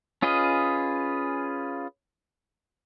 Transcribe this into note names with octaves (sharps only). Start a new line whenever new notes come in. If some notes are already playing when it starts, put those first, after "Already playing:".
C#4 F4 G#4 B4 D#5